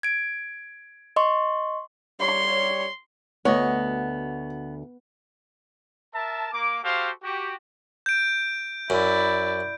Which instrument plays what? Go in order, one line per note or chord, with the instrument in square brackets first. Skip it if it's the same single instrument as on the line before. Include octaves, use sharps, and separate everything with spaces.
[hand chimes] G#6 D7
D#5 C6 C#6
[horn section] G3 C#5 [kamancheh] C6
[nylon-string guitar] D2 F#4 D#5 [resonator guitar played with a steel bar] B3 [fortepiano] C#5
[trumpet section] A#4 E5 A5
A#3 D6
F#4 G4 A4 C5 F5
F#4 G4
[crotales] G6 D7
[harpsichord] F#2 [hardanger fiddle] E4 D5